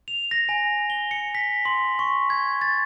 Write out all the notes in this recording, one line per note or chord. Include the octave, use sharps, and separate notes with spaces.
F7
A#6
G#5
G7
C#7
B6
C6
C#6
G#6
A6